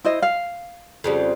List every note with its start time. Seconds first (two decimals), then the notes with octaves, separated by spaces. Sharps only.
0.05 E4 C5 D#5
0.22 F5
1.04 F2 C#3 G3